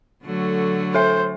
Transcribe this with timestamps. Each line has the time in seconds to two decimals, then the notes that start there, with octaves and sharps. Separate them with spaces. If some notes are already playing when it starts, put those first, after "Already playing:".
0.24 D3 F#3 A3
0.95 A4 C5 E5